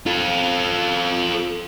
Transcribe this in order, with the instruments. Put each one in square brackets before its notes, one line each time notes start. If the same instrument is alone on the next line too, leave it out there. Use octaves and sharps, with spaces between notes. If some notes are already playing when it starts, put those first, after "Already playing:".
[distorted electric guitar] F4 A4